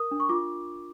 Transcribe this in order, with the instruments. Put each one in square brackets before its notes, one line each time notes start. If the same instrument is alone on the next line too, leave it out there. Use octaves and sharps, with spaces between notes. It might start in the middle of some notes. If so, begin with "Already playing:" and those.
Already playing: [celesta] A#4 D#6
D4
C#6
F4 D6